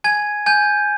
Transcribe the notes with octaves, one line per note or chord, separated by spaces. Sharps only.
G#5 G#6
G#5 G6